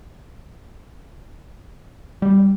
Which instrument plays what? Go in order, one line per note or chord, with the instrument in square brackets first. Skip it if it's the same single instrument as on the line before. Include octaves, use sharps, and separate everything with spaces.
[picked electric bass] G3